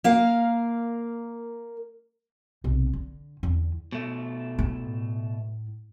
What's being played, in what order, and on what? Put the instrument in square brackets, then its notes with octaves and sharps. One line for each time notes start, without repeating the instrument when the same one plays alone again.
[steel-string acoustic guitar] A#3 A#4 F5
[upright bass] B1 C3
D3
E2 D3
[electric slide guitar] B2 A3
[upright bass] A2